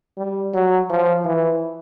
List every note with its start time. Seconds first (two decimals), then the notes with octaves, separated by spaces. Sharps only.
0.17 G3
0.54 F#3
0.90 F3
1.24 E3